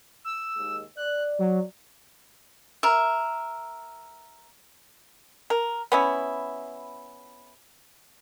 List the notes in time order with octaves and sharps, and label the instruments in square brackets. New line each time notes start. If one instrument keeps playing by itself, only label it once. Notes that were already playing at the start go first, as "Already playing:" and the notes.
[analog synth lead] E6
[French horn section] D#2 G#3
[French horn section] D5 [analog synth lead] F#6
[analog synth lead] F#3
[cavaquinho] A#4 E5
[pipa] A#4
B3 C#4 E4